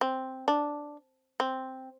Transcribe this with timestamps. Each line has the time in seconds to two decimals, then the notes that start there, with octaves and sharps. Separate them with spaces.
0.01 C4
0.48 D4
1.40 C4